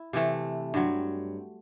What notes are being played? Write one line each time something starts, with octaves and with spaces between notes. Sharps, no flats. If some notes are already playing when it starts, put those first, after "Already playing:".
Already playing: E4
C3 E3 A3
G2 F#3 C4